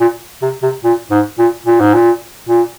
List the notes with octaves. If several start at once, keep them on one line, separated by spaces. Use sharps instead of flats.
A#2
C3
C3
A#2
G#2
A#2
A#2
G#2
A#2
A#2